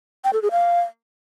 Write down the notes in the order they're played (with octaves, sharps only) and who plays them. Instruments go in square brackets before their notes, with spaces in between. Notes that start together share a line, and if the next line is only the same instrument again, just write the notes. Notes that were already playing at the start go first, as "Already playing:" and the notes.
[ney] G5
A4
G#4
F5